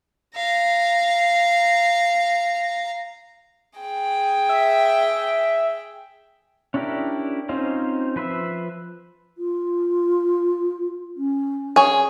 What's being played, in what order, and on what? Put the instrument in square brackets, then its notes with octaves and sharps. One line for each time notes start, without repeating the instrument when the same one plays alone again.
[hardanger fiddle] F5 A#5
[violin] G#4 G5
[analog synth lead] E5
[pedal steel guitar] C#4 D4 E4 G4 A#4
C4 C#4 D#4 F4 C5
F3 B4 C5 E5
[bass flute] F4
C#4
[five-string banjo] G#4 C#5